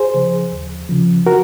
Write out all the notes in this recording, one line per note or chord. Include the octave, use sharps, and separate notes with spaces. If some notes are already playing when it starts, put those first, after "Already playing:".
Already playing: G#4 C5
C#3 F3
D#2
C#3 F3
F#4 A#4